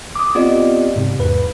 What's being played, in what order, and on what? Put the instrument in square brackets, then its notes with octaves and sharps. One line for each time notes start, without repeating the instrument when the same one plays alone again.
[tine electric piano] D6 D#6
B3 C4 F4 G4 D5 D#5
G#2 C3
E2 G#2 B4